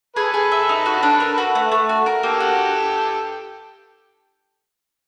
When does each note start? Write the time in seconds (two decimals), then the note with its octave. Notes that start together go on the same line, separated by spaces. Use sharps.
0.16 G#4 A4 B4
0.34 G#4
0.52 E5
0.69 D#4
0.86 F#4
1.03 D4
1.20 A#4
1.38 F#4
1.55 A3
1.71 A3
1.89 F#4
2.06 A#4
2.23 A#3 G4 A4
2.40 F#4